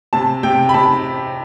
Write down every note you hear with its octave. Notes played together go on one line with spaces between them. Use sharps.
C3 A5
C3 G5
B5
C3 A5